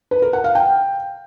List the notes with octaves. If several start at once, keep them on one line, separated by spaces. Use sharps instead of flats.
B4
A#4
F#5
F5
G5